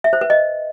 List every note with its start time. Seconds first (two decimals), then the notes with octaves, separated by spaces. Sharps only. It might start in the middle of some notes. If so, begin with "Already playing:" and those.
0.04 E5
0.13 C5
0.21 B4
0.30 D#5